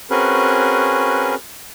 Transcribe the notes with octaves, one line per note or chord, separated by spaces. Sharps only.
C4 C#4 F#4 G#4 A#4 B4